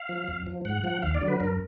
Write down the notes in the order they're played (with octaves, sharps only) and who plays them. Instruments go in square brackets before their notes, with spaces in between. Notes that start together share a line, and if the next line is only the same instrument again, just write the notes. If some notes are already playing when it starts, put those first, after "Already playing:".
Already playing: [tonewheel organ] F5
F3
F2
F3
G#2 F#5
F3 F#5
D#2 F5
D5
D3 F#3
B4
F#2 A#4